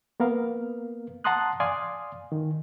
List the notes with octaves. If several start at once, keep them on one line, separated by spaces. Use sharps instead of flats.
A#3 B3 A#4 F5
F#5 A5 A#5 C6 D#6 F#6
D5 F5 G#5 C6 D#6
D#3